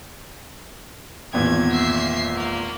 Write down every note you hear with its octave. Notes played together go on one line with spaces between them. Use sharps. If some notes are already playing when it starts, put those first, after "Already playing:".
G#1 E2 A#2 G#6
E5 C7
A#3